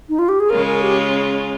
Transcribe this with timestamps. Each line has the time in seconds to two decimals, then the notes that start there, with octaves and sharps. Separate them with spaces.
0.09 D#4
0.19 F4
0.29 G4
0.40 G#4
0.50 C#3 G#3 C#4 F4 A#4
0.66 A#4
0.82 G4